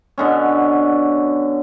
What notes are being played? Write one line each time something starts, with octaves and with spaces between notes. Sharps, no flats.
B2 D3 C#4